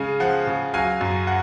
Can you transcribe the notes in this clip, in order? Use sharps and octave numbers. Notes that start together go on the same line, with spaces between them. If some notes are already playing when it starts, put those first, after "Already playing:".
Already playing: C#3 G#3 F5 G#5
F3 F#5
C#3
F#3 F5 G#5
F#2
F#5